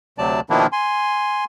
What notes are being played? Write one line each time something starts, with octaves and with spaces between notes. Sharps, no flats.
D2 C3 F#3 D5 A5
B2 D#3 F3 A#3 D4 E4
G#5 C6